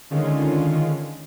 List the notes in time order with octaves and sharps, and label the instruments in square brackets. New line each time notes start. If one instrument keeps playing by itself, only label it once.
[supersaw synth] D3 D#3 G#3 C#4 F4